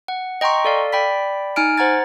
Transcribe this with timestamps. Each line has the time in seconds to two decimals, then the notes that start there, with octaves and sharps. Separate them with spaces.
0.08 F#5
0.41 D#5 G5 A#5 C6 C#6
0.65 A4 D5 F5
0.93 D5 G5 B5 B6
1.56 D#4 G#5 F6 D7
1.77 C5 F#5 A#5 G#6 A6